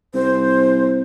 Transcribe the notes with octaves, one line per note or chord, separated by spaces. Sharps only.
C2 C5